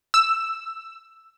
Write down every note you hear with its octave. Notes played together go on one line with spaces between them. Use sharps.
E6